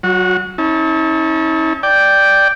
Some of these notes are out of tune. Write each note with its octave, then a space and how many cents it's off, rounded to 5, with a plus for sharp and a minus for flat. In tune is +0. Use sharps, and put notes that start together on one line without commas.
F#3 +15 F#4 -30
C#4 -15 E4 -45 A5 +0
D5 +0 G5 +0